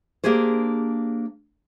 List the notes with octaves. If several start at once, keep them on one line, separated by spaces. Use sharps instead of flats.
A#3 D4 G4 G#4 C5